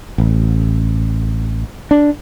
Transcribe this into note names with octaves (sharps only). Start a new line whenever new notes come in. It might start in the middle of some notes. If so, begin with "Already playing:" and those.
A1
D4